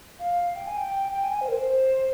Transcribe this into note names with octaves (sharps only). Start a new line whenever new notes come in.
F5
G5
G#5
G5
G5
G#5
C5
A#4
C5